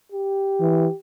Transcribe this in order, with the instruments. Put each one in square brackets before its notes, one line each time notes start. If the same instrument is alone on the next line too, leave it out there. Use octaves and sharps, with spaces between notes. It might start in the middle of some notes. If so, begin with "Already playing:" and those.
[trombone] G4
[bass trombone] E3